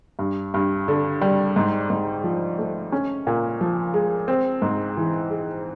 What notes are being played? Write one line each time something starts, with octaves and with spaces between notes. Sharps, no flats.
G2
G2
D3
G3
G#2
G#2
F3
A3
C#4
A#2
F3
G#3
C4
G#2
E3
G#3